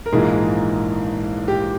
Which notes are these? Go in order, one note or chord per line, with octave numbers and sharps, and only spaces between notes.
A#4
A#1 G#2 E3 A#3 G#4
G4